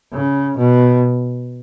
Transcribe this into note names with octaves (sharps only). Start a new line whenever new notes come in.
C#3
B2